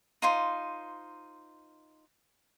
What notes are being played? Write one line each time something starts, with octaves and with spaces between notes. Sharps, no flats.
D#4 F4 C5